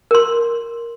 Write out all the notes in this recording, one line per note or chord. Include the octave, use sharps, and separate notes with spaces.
A#4 C6